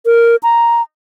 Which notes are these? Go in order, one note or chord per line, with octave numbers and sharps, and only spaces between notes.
A#4
A#5